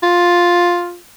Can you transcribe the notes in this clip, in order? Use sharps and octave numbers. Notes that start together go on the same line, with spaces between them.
F4